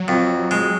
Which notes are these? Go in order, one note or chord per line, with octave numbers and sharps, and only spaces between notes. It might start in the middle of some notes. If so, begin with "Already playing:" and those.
Already playing: F#3
F2
G#3